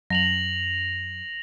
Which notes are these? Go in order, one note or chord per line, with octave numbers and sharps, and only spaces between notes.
F#2 A#6 F7 F#7